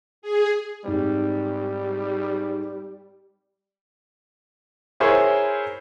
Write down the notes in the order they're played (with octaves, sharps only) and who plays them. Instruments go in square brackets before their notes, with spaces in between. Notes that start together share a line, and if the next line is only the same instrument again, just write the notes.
[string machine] G#4
[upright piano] G#2 C4 [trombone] G3
[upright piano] E4 G#4 A#4 C5 C#5